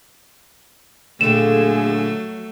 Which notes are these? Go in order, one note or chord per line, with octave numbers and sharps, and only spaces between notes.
A#2 D3 F#3 A3 G#4 E7